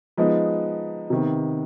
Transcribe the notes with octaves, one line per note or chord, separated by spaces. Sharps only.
F3 G#3 B3 D#4
C3 D#3 B3